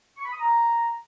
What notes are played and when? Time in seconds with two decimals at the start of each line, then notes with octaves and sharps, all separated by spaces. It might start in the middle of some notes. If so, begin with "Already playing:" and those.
0.17 C#6
0.25 B5
0.33 D#6
0.40 A#5